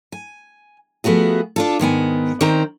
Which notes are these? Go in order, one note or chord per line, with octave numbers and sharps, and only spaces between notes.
G#5
F3 A3 B3 F#4 G#4
D4 F4 A4
G#2 D#3 B3 G#5
D#3 C4 C5 D5 G5 A#5